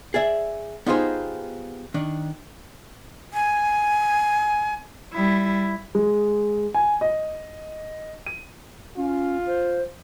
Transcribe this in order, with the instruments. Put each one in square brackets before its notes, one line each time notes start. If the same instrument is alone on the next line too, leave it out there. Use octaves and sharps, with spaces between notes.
[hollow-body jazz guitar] G#4 D5 E5
B3 D#4 F4 G4 G#4 C5
D#3 D4
[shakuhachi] G#5
[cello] G3 E4
[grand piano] G#3
G#5
D#5
D#7
[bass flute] C#4 [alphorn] F4
[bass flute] C5